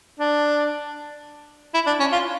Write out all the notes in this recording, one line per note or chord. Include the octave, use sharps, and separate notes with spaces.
D4
E4
D4
C#4
F4